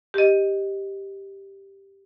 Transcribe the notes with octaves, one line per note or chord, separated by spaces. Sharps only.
G4 D#5